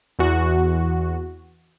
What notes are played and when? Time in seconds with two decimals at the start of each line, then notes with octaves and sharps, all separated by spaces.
0.19 E2 F#4